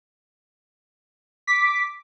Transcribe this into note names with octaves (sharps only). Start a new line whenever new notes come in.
D6 B6